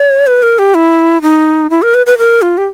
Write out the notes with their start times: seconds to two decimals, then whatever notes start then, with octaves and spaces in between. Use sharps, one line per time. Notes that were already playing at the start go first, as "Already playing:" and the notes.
Already playing: C#5
0.27 B4
0.43 A#4
0.59 G4
0.75 E4
1.22 D#4
1.70 E4
1.82 A#4
1.94 B4
2.06 B4
2.18 A#4
2.42 F4
2.58 G4